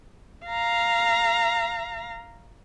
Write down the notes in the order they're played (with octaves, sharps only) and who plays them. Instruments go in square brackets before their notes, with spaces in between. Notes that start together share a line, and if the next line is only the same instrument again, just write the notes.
[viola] F5 A#5